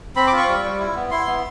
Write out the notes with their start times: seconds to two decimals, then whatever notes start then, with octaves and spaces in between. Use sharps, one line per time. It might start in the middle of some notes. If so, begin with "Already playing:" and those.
0.16 C4 B5
0.27 D6
0.32 F4
0.37 C#6
0.48 G3
0.64 G3
0.79 E4
0.95 B3
1.11 E4 C6
1.27 B3